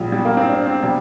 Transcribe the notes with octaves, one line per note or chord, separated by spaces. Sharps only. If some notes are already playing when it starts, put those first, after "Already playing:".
Already playing: A#1 A#2 F3 G3
G3
A#3
C4
D4
C4
C3 G3